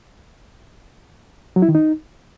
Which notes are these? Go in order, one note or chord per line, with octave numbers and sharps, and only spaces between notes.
F#3
E4
D#3
D#4